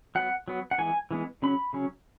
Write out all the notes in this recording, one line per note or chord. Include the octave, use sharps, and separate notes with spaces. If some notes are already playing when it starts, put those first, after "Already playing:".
F#3 B3 F#5
F#3 B3
F#5
E3 G#3 B3 G#5
E3 G#3 B3
C#3 F#3 C#4 B5
C#3 F#3 C#4